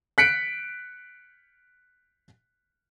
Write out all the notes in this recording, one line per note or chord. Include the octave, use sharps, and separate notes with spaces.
F#6 B6 C#7 D7